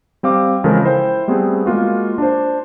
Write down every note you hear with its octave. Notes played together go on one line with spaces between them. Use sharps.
G3 C4 F5 D6
C#3 E3 F3 G#3 A4 A#4
E4 C5 G5
G3 A3 B3 C4 G#4
G#3 A#3 F4 F#4
D4 C5